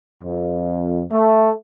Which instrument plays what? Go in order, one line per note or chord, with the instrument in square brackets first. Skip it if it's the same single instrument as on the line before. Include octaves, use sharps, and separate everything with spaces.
[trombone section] F2
A3